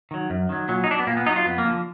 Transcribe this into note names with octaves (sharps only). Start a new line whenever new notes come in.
D#3 F#3
F#2
D#3 F#3
A#2 F#3
D#4
F#3 D4
B3
A#2 A#3
B3
F#3 D#4
F4
F2 B3
A#3
D3 F3